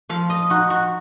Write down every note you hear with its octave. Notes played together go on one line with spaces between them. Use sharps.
F3 F5
D#5
D#4 F#4
F#4